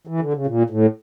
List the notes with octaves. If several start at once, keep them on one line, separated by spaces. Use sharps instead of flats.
E3
D3
C#3
A#2
A2